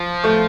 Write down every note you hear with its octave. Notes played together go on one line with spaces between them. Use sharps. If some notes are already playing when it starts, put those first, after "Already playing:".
Already playing: F3
A3